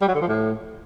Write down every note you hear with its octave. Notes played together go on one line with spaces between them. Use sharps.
G3
F#3
D3
F3
A2